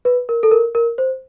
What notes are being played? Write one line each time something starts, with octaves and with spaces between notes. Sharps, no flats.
B4
A#4
A4
A#4
A#4
C5